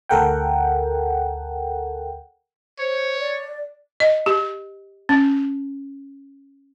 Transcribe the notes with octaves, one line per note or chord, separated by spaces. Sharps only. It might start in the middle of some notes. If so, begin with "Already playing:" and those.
D2 A4 A#4 F#5 G5
C5 C#5
D5
D#5
G4
C#4